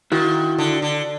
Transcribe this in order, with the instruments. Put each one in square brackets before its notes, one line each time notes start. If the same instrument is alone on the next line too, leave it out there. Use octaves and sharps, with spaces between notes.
[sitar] D#3 [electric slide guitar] E4 F#4
[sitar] D3
D3